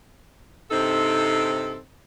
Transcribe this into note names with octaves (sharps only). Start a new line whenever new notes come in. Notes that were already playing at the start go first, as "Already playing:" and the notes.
G2 C3 C4 D#4 A4